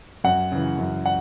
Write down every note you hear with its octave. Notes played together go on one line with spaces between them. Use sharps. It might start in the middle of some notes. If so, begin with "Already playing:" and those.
F#2 F#5
C#3 E3
F#2
F#5